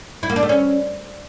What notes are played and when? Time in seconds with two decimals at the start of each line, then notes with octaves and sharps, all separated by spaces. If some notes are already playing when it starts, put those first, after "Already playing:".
0.23 E4
0.29 A#3
0.36 D4
0.43 A3
0.49 C#4